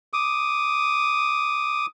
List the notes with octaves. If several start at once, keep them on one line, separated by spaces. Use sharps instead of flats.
D6 D#6